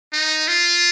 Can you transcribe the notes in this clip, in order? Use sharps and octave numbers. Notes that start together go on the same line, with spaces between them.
D#4
F4